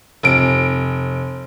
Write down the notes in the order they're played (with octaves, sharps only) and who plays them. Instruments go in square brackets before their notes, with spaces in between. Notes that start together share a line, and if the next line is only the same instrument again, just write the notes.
[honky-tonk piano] F1 D7